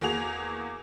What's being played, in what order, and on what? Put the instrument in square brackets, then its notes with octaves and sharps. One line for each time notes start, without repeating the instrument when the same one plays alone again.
[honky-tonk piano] E2 A#3 F#4 G#4 F7